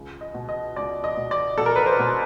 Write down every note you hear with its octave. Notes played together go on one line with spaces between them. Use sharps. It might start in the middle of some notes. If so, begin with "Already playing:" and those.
Already playing: C#2
D#5
B2
D#5
C#2 D5
D#5
B2
D5
B2 A4
A#4
B4
C5
B2